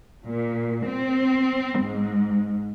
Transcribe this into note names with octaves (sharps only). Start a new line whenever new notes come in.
A#2
C4
G#2